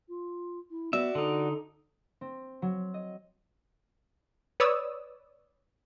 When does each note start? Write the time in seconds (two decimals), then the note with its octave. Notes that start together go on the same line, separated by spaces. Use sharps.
0.09 F4
0.71 E4
0.93 B3 F#4 D5 E5
1.15 D3 D#4 A4
2.21 C4
2.62 F#3
2.94 D#5
4.60 B4 C#5 D5 D#6 E6